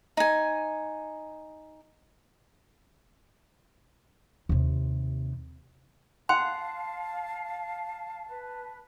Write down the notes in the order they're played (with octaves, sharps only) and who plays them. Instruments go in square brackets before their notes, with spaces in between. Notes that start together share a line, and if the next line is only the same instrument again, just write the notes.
[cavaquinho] D#4 G#5
[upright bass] D#2 C3
[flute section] F5 [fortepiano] F#5 [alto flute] A5 [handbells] C6
[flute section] B4